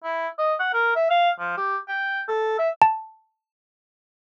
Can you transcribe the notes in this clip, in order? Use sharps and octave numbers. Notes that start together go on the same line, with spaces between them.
E4
D#5
F#5
A#4
E5
F5
F3
G4
G5
A4
E5
A5